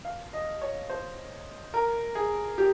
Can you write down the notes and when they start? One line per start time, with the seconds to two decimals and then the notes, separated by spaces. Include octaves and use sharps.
0.05 F5
0.33 D#5
0.61 C#5
0.90 C5
1.74 A#4
2.15 G#4
2.58 G4